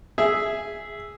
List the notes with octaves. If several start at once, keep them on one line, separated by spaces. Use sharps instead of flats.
G#4 E5